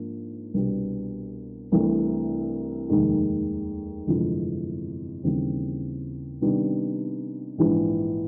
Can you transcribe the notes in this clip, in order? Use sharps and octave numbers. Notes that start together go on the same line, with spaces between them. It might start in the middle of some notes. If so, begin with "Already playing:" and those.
Already playing: G#2 F3 A#3 D4
C2 B2 G3 B3 D4
C2 C3 E3 A3 D4
F1 D#2 D#3 G#3
G1 F2 C3 E3 G#3
D#2 C#3 E3 G3 C4
C3 D#3 G3 B3 D4
A#1 G#2 E3